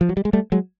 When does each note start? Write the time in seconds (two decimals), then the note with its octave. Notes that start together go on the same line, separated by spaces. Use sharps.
0.01 F3
0.09 F#3
0.17 G3
0.25 G#3
0.33 G3 A3
0.52 F#3 G#3